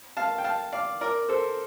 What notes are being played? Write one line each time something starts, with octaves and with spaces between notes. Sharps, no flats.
F5 A5
G5
F5 A5
D5 F5
A#4 D5
A4 C5